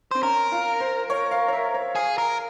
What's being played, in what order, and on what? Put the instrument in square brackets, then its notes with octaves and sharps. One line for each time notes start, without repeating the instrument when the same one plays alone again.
[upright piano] C4 [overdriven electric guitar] C5
[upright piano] C#4 [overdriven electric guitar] A#4
[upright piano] F4
C5
C#5
F5
C#5
E5
C#5
[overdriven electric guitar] G#4 [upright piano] F5
[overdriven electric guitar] A#4